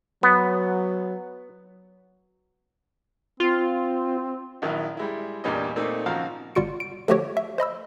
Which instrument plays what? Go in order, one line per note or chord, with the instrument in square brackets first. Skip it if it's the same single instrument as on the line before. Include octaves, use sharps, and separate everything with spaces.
[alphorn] F#3 [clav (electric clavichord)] B3
[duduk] C4 [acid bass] F4
[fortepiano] A#1 D#3 F#3 E4
G3 G#3 E4
E2 G2 A#2 G3 C#4 D#5
A#2 A3 A#3 C4 D#4 A4
G#1 C#3 F3 F#4 F5 A#5
[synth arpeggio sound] G1 G3 F4 F#4 C#7 D7
D7
D3 F3 A3 F#4 G4 C#5
E5
C5 D#5 B5 E6